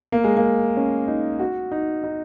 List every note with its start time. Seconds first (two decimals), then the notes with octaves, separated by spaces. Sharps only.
0.12 A#3
0.24 G#3
0.37 A#3
0.77 C#4
1.07 D#4
1.39 F#4
1.72 D#4
2.04 D#4